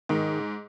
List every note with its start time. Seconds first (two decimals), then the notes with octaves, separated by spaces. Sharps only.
0.09 G#2 D#3